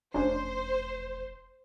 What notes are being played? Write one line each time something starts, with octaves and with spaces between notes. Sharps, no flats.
F1 E2 C#4 D4 C5